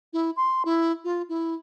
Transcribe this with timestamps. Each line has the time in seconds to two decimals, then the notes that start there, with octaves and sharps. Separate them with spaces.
0.13 E4
0.36 C6
0.65 E4
1.04 F4
1.29 E4